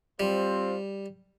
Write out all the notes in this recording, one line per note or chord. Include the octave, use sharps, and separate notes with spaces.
G3 C4 F4 C5